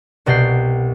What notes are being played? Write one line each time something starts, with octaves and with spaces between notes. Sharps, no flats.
C2 B2 F#5 G5 C7